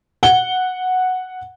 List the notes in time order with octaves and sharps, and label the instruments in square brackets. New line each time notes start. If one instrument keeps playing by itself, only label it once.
[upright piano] F#5 G7